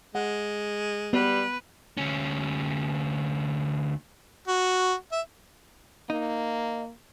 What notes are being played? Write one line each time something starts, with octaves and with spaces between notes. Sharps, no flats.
G#3 F#5
G3 B3 B4
D2 C#4
F#4
E5
A#3 D#4